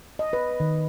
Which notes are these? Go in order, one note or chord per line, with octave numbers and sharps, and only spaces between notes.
D#5
B4
D#3